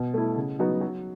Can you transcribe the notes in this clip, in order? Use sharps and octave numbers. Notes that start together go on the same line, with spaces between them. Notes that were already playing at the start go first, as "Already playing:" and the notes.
Already playing: B2
A3 E4
C#3
F#3 B3 D#4 F#4
F#3